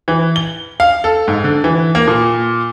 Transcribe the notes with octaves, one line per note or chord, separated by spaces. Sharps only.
E3
G7
F5
A4
G#2
D3
E3
A#3
A#2